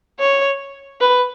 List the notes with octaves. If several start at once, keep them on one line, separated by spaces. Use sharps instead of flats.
C#5
B4